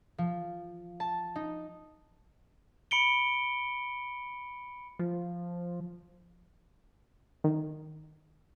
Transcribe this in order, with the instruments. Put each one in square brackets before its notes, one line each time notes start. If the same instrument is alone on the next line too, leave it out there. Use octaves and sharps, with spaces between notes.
[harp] F3
A5
D#4
[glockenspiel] B5 C#7 D7 G7
[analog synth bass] F3
[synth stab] D#3